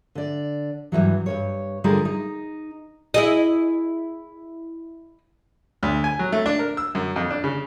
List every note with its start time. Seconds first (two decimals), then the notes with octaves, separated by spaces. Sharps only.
0.15 D3 D5
0.92 G2 B2 E3 F#3
1.26 G2 A#2 C#5
1.84 D3 G3 F4 G#4 A#4
2.05 D#4
3.14 E4 G#4 D#5
5.83 D2
6.04 G#5
6.19 F#3
6.32 A3
6.46 D4
6.59 A#4
6.77 E6
6.95 F#2
7.16 F2
7.31 D4
7.44 C#3